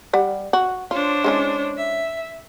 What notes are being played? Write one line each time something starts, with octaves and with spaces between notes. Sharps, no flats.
G3 F#5
F#4
D4 F4 C5 C#5
G#3 C#4 E4
E5